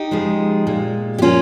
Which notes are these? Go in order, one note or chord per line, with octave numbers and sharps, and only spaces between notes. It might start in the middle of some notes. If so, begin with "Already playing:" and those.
Already playing: D#4 G4
C#3 F3 G#3
A#2 G#3
G4
A#2 F3 A#3 C#4 F4